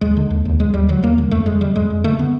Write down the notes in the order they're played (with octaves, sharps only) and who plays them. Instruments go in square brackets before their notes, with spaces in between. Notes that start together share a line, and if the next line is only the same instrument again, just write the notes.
[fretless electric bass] D#2 G#3
D3
D#2
D#2
D#2 G#3
D#2 G3
D3 F#3
D#2 A#3
D3 G#3
F2 A3
F2 G#3
D3 G3
F2 G#3
F2
D3 A3
D3 B3